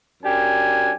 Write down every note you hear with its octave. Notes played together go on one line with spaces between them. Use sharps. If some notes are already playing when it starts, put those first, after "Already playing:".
F#2 D4 G4 G#5